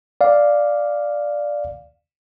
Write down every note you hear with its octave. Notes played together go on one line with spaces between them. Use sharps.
D5 F5